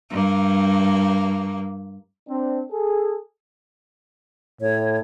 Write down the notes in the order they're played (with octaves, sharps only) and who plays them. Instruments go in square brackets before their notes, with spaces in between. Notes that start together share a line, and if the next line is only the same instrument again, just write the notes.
[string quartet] G2 A#3
[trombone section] C4 D4
G#4 A4
[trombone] A2 [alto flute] C#5